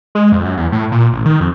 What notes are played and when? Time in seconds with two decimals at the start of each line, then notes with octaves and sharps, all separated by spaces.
0.15 G#3
0.32 F2
0.45 F#2
0.57 E2
0.72 A2
0.92 A#2
1.13 A1
1.25 D#3
1.40 F2